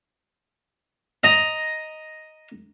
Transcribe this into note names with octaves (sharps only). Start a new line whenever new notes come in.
D#5 A#5